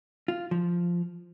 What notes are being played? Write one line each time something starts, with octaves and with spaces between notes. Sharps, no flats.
F4
F3